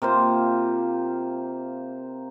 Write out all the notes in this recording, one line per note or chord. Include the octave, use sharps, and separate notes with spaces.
C3 A#3 F4 C5